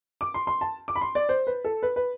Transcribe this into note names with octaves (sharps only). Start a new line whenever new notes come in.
D6
C6
C6
A5
D6
B5
C6
D5
C5
B4
A4
B4
B4